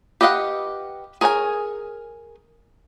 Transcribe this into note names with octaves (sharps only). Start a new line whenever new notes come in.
G4 B4 D#5 F5 F#5
G#4 A#4 C#5 F#5 G#5